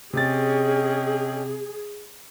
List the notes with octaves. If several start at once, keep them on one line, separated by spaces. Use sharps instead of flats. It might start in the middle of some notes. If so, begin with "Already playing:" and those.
C3 C#4 G#4 D#5 G5 A6